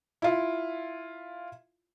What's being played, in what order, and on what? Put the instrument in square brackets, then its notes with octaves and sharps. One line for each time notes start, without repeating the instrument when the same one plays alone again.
[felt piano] E4 F4